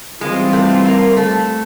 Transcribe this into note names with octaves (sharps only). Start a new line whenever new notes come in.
E3 G3 G#3 C4 F4
A3
A#3
A3